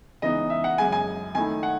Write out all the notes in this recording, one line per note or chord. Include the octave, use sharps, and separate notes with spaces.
C#3 E3 G#3 B3 D#4 D#5
E5
F#5
F#2 C#3 G#3 G#5
G#5
D#3 A3 E4 G#5
F#5